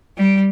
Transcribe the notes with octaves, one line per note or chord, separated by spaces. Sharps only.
G3